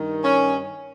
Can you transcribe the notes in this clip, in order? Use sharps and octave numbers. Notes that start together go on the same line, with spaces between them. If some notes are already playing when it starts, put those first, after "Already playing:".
Already playing: G2 D#3
C#4